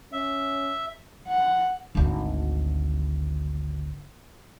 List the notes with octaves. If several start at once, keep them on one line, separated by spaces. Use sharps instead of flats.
C#4 E5
F#5
G#1 D2